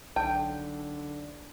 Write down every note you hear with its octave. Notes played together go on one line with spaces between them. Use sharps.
B1 D3 G5 A5